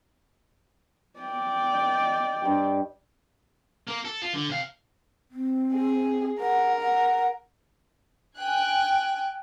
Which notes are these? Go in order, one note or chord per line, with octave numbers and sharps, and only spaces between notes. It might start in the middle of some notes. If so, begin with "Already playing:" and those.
D5 G5
D#5
G2 G4
A#3
A4
F4
D3
C3 F5
C4
G#4
A#4 F#5
F#5
G5 G#5 F#6